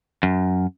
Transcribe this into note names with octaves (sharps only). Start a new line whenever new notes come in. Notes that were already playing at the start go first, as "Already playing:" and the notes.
F#2